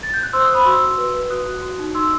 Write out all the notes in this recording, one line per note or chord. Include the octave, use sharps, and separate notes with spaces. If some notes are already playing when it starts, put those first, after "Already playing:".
A6
G6
F#6
C5 C6 E6
D#6 F#6
C5
B5 D#6
F#4 C6 E6
F#4
B4
B4
F#4 D#6 F#6
F#4
F#4
D#4
D#4 C6 E6